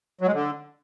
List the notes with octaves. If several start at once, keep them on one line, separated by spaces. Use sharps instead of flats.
F#3
G#3
D3